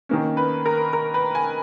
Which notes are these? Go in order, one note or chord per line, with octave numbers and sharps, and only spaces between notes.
D#3 A#3 C#4
B4
A#4
A#4
B4
G#5